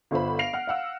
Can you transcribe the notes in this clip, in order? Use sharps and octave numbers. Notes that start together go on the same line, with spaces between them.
G1 D3 F4 C5 B5
F5 A#6 C7 D7 F7
F#5 F6
F5 F#5 E6